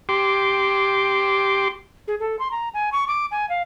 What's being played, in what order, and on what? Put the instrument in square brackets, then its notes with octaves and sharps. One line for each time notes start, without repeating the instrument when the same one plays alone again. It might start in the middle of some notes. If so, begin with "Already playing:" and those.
[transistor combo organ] G4 C6 D6
[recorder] G#4
A4
C6
A#5
G#5
C#6
D6
G#5
F5